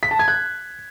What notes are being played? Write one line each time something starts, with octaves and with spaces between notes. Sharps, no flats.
B6
A5
G#6
F#6